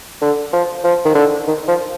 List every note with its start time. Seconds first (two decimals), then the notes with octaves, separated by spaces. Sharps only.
0.22 D3
0.53 F3
0.84 F3
1.05 D#3
1.15 D3
1.47 D#3
1.68 F3